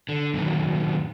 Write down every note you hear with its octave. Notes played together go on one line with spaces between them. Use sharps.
D3
F#2 A#2 D#3